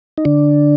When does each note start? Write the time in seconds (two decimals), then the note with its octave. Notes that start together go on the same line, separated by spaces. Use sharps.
0.18 D#4
0.25 D3 D4